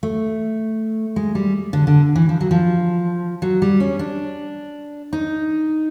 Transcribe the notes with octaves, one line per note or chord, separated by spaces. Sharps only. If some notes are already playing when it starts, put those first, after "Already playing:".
A3
G#3
G3
D3
D3
E3
F3
F#3
F3
F#3
G3
C#4
D4
D#4